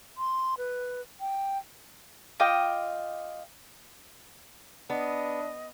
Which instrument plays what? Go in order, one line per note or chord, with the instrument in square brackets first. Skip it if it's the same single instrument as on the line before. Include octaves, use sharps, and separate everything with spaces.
[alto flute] C6
B4
G5
[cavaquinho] F4 D#5 G5 D6
[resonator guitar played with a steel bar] B3 [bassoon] D4 [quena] D#5